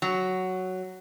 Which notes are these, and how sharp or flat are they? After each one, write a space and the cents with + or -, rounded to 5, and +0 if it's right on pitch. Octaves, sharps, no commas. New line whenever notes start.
F#3 +5